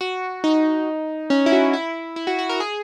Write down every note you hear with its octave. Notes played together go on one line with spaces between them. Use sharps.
F#4
D#4
C#4
E4
F#4
E4
E4
F#4
F#4
A#4
G#4